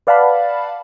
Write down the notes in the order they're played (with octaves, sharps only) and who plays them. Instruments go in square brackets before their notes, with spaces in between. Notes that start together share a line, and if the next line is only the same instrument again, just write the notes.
[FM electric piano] B4 D5 F5 F#5 A5 B5